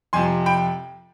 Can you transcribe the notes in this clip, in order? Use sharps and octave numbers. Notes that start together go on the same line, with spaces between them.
F2 C3 F3 G#5 C6
G5 B5